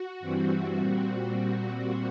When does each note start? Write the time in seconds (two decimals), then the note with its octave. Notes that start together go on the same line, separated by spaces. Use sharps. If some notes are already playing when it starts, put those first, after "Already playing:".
Already playing: F#4
0.20 G2 E3 G3 C4
0.77 A#2 G3 C4